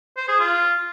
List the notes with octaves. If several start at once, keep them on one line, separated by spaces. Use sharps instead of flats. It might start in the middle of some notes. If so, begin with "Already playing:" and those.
C5
G#4
F4